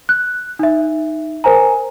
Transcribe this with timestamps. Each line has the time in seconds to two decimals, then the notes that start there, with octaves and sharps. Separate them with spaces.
0.09 F#6
0.59 D#4 E5
1.44 A#4 C5 G#5 A#5